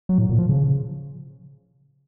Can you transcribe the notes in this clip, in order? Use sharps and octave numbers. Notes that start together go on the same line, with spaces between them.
F#3
A2
A#2
F3
C#3